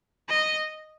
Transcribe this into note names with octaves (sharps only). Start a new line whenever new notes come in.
D#5